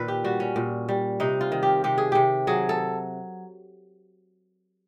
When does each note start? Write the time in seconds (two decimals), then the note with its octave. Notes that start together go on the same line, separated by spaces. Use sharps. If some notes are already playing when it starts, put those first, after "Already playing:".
Already playing: A#2 D#3 B4
0.08 G4
0.24 G3 F#4
0.40 C#4
0.56 A#2
0.89 G3
1.20 C3 D#4
1.41 F4
1.52 D#3
1.63 G4
1.84 C3 G4
1.98 G#4
2.12 C3 G4
2.47 F#3 G#4
2.69 A4